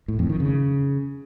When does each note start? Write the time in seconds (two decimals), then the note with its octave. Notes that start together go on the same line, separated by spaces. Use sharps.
0.08 A2
0.19 F2
0.29 D#3
0.40 C#3